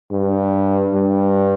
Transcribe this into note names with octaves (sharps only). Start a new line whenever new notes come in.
G2
G2